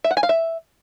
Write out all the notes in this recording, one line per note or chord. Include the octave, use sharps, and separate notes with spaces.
E5
F#5
G#5
F5
E5